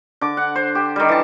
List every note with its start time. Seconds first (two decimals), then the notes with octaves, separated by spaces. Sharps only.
0.21 D3 D6
0.37 F#5
0.56 C5
0.75 G4
0.96 D#3 G3
1.09 E3 A5